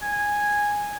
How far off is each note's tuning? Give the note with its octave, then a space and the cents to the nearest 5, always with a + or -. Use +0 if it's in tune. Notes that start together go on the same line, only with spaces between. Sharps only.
G#5 -5